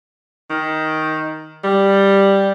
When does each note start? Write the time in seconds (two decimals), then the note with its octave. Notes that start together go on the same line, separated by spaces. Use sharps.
0.50 D#3
1.64 G3